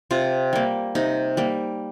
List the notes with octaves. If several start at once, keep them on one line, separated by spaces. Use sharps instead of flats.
C3 F4
G3 A#3
C3 D#4
G3 A#3